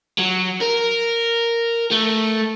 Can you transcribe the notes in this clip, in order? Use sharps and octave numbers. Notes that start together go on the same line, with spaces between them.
F#3
A#4
A3